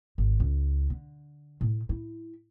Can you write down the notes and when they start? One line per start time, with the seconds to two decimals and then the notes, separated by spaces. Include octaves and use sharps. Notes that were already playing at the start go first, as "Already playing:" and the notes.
0.18 G#1
0.40 C#2
0.90 D3
1.61 A2
1.89 E4